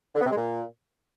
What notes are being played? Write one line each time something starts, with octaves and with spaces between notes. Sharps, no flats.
D3
B3
C3
G#3
A#2